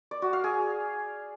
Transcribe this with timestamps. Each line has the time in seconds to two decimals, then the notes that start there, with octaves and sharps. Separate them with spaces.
0.11 D5
0.22 F#4
0.33 F5
0.44 G#4